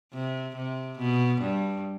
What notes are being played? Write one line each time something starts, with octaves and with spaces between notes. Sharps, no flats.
C3
C3
B2
G2